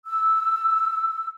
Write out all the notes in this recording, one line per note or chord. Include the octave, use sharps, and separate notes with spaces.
E6